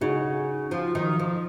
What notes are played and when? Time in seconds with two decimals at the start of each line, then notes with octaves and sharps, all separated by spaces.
0.01 C#3 D#4 F#4
0.71 F3
0.95 D#3
1.19 F3